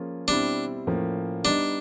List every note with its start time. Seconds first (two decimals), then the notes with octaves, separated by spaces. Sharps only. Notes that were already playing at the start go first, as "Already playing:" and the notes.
Already playing: F3 A#3 C#4 F4 G#4
0.28 B2 G3 C4 D4 E4
0.87 A2 F3 A#3 C#4
1.44 G3 B3 D4 D#4